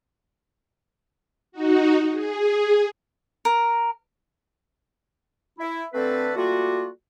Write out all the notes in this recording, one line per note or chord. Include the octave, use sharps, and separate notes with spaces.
D#4 F#4
G#4
A#4
E4
D3 A3 C4 A4 B4
G3 A3 A#3 F4 F#4